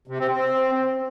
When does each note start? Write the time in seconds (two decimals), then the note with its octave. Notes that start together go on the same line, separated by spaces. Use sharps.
0.07 C3
0.19 C4
0.30 C4